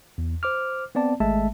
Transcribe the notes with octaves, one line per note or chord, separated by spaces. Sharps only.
E2
C5 D6 F6
B3 C4 D5 A5
G#1 G#3 A3 E5 A5